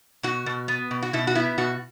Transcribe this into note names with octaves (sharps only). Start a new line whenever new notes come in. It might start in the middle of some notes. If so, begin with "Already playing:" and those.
B2 F#4
B2
B3
B2
F#4
B2 E4
F#4
B3 E4
B2 F#4